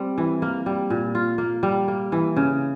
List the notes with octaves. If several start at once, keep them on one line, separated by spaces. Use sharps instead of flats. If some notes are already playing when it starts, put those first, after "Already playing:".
Already playing: G3 C4
E3
A#3
G3
A#2
F4
A#3
G3
A#3
E3
C#3